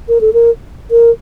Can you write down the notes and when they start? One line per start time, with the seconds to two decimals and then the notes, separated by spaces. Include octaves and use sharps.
0.09 A#4
0.21 A4
0.33 A#4
0.91 A#4